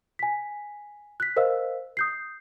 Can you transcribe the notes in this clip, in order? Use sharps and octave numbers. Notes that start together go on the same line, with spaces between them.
G#5 B6
F#6 B6
A#4 C5 D#5 F5 E6
D#6 G6 C7